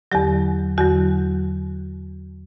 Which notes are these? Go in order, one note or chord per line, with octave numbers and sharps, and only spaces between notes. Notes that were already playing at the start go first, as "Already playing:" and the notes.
E2 D3 F#3 G4
E2 D3 F#3 F#4